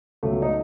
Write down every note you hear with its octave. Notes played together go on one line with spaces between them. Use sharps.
C#2 B2 F#3 A3
D#4